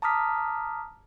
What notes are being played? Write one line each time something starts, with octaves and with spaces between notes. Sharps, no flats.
A5 A#5 D6 D#6 F6 B6